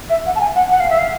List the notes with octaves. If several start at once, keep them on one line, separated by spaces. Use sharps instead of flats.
E5
F#5
A5
G#5
F#5
F#5
F5
E5
F5